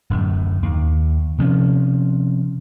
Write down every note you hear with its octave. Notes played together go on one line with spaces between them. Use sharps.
D1 F#2 A2
D#2
C3 F3 C#4